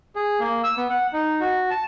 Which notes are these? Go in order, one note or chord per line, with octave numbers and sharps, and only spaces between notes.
G#4
A#3
E6
B3
F#5
D#4
F#4
A5